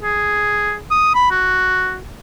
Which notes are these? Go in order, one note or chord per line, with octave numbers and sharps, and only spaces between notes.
G#4
D#6
B5
F#4